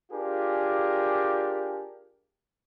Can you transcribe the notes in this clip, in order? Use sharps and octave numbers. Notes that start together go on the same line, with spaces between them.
D4 F4 G4 G#4 A#4